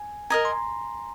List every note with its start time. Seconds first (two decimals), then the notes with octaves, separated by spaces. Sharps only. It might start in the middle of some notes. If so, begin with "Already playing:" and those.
Already playing: G#5
0.30 A#4 D#5 G#5 A#5
0.45 C6